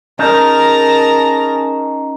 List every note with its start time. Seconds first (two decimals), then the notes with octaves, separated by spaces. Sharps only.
0.19 C#4 D#4 G#4 A#4 A5 A#5